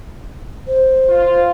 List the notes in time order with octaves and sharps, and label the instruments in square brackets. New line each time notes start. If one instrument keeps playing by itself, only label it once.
[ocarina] C5
[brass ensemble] F4